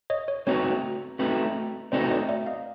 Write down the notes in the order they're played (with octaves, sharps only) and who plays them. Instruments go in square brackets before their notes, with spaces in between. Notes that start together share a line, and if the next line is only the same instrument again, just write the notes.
[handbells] C#5 D#5
C#5
[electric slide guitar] A3 C4 D#4 F#4 B4 [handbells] C#5
[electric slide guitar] A3 C4 D#4 F#4 B4
[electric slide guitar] A3 C4 D#4 F#4 B4 [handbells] C5 D5
[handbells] C#5 D#5
D5 E5
D#5 F5